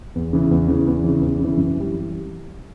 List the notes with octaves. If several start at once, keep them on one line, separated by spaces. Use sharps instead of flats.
E2
C#3 E3
E2
C#3 E3
E2
C#3 E3
E2
C#3 E3
F#2
E3 G3